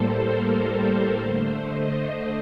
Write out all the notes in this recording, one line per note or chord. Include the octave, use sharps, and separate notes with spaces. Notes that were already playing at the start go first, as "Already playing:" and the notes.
Already playing: A2 G3 A#3 A4 C5
A#4
A#4
D3 A3 C5
D#5
D#5